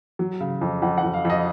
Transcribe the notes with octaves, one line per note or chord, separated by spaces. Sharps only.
F#3
C#3
F2
F2 F#5
F#5
F2
F5
F2 D#5